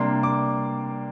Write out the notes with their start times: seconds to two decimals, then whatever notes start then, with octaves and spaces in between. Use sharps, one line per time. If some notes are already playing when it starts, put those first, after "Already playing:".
Already playing: C3 G3 A#3 D4 C6
0.23 D6